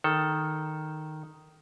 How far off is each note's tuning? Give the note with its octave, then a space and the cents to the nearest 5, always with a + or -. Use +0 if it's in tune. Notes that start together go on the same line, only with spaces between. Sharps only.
D#3 +0 A4 +0